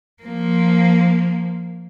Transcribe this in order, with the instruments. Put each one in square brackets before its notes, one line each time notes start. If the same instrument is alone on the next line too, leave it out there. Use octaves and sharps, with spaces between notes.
[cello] F3 A#3